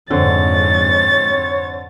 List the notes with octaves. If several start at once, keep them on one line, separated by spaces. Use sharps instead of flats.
F2 G#2 D3 C4 C#5 A6